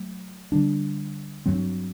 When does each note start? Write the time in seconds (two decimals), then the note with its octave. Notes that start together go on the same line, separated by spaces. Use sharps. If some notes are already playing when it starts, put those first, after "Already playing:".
Already playing: F#3 A3
0.52 D3 G3 D4
1.46 G2 F#3 C4